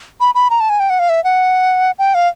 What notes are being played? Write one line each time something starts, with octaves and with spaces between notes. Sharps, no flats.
B5
B5
A#5
A5
G#5
G5
F#5
F5
E5
F#5
G5
F5